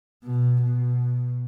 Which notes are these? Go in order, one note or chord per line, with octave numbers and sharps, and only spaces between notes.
B2
B2